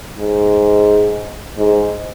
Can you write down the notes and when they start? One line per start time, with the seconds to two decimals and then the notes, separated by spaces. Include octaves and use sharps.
0.18 G#2
1.58 G#2